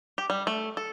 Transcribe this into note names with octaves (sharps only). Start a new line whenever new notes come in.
G4
G3
A3
A4